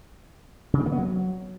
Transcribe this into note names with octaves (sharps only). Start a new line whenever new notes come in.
C#3
C4
A#3
B3
F#3